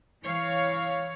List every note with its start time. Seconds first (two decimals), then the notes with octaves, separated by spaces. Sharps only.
0.22 E3 C#5 F5